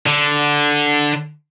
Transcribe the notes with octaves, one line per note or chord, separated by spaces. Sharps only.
D3